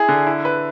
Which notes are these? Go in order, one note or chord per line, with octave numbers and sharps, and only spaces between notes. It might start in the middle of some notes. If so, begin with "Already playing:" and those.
Already playing: E4 G#4
D3
E4
B4